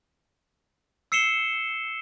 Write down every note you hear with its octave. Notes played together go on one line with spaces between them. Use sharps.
E6 C7 C#7 E7 G7